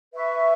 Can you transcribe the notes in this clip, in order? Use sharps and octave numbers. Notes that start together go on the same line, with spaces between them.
B4 E5 C#6